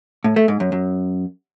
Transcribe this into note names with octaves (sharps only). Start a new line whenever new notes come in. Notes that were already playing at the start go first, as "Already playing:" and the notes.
A2
A3
G#2
F#2
F#2